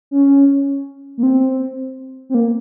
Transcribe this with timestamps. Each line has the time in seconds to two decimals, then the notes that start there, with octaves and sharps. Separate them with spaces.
0.11 C#4
1.18 A#3
1.23 C4
2.29 C4
2.35 A#3